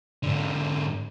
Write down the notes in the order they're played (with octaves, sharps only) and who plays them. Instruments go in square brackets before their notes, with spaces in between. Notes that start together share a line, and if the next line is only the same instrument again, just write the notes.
[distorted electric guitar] G#2 D3